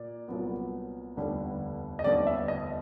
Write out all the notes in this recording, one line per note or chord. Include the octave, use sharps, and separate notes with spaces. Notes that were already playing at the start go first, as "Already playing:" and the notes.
Already playing: A#2 D5
C2 A#2 F#3 B3
F1 D#2 D3 G3 B3
D#5
F1 D#2 D3 G3 B3 D5
E5
D#5